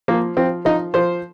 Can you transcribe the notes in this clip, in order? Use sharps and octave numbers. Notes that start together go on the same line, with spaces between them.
F3 A#3
F3 C4
F3 D#4
F3 C5